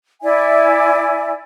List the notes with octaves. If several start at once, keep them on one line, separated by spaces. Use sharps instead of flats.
E4 D5 E5 G#5